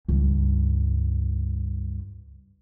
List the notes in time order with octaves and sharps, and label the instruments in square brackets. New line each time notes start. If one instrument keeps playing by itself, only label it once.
[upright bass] C#2 G2